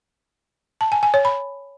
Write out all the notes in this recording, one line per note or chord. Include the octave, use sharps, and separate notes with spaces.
A5
G#5
G#5
C#5
B5